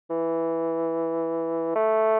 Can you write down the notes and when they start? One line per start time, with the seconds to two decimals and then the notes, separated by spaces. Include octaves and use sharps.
0.10 E3
1.76 A3